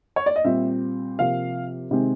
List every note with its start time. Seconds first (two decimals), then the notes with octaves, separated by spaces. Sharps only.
0.16 C#5
0.26 D5
0.36 D#5
0.44 A#2 G3 C4 E5
1.19 C3 F3 A#3 F5
1.91 C3 D#3 G#3 C4